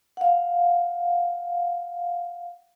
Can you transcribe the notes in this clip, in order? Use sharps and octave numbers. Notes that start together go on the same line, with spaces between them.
F5 F#5